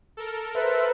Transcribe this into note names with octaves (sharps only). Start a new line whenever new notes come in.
A4 A#4
B4 C5 E5